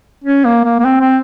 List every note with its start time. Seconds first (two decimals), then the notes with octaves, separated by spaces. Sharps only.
0.24 C#4
0.45 A#3
0.65 A#3
0.80 A#3
0.85 C4
1.01 C4